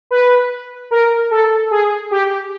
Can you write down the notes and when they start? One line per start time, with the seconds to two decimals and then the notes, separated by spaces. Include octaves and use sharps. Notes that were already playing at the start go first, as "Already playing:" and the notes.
0.11 B4
0.91 A#4
1.31 A4
1.71 G#4
2.11 G4